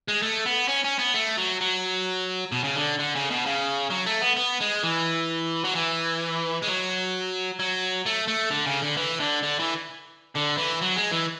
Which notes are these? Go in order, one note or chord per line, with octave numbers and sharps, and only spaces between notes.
G#3
A3
B3
C#4
C#4
B3
A3
F#3
F#3
B2
C#3
D3
D3
C#3
B2
C#3
F#3
A3
B3
B3
G#3
E3
F#3
E3
G#3
F#3
F#3
A3
A3
D3
C#3
D3
E3
D3
D3
E3
D3
E3
F#3
G#3
E3